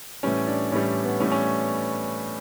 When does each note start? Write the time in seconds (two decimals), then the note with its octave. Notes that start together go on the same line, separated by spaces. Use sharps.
0.23 A2 E3 G3 C#4
0.47 D4
0.72 A2 E3 G3 C#4
1.04 B3
1.20 A2 E3 G3 C#4
1.32 C#4